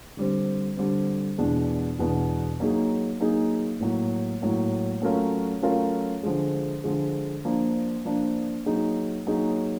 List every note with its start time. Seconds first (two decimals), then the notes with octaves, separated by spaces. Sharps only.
0.17 D3 G3 C4
0.77 D3 G3 C4
1.38 E2 B2 G#3 B3 D4
1.99 E2 B2 G#3 B3 D4
2.60 F#3 A#3 D#4 G#4
3.20 F#3 A#3 D#4 G#4
3.81 A2 F#3 A#3
4.42 A2 F#3 A#3
5.02 F#3 A3 C#4 F4 A#4
5.62 F#3 A3 C#4 F4 A#4
6.23 D3 F3 G#3
6.84 D3 F3 G#3
7.45 F3 A#3 D4
8.05 F3 A#3 D4
8.66 F#3 A#3 D#4 G#4
9.27 F#3 A#3 D#4 G#4